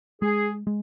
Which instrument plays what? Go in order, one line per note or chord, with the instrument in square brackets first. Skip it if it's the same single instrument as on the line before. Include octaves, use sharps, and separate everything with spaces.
[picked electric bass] G#3 [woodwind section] G#4
[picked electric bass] G#3